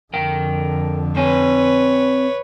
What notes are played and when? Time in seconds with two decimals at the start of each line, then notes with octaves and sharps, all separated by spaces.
0.14 F2 D3 A#4 G5
1.16 C4 B4 C#5 G#5